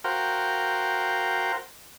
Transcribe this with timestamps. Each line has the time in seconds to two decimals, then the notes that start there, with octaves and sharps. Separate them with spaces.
0.04 F#4 A#4 C5 F5 G5